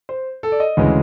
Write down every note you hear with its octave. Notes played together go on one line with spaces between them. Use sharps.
C5
A4
D5
D#5
D2 C#3 E3 G#3